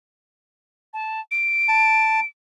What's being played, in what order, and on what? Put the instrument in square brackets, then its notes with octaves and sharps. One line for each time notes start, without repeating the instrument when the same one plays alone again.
[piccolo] A5
D7
[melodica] A5